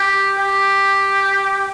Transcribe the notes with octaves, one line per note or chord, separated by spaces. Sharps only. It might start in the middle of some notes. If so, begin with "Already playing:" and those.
Already playing: G4
G4